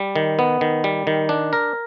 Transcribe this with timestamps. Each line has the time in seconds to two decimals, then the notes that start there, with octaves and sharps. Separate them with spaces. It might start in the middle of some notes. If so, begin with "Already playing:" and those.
Already playing: G3
0.16 D#3
0.39 B3
0.61 D#3
0.84 G3
1.07 D#3
1.29 D4
1.53 A#4